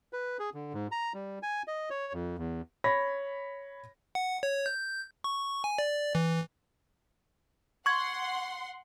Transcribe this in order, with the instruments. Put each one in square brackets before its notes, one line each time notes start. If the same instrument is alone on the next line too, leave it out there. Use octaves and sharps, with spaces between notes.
[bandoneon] B4
G#4
D3
G#2
A#5
G3
G#5
D#5
C#5
F2
E2
[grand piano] C#5 B5 A#6
[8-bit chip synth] F#5
C#5
G6
C#6
G#5
D5
E3
[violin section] F#5 C6 [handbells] C#6 G#6